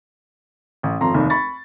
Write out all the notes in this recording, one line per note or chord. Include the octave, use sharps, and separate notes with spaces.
A1
G#1 F2 A#5 C6
F1 D#2 D#4
B5 C#6 A6